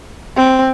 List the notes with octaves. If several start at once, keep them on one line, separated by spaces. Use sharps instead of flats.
C4